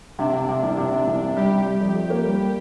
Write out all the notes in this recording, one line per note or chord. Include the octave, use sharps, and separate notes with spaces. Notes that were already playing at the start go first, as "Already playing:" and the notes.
C3 D4
C3
C3
C2
C3
C3
C2
C3
G3 G4
C3
G3
F2
F2
A#3
G3